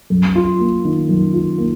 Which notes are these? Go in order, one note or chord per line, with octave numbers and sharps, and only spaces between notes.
F#2
F4
A#3
D#3
F#2
F4
A#3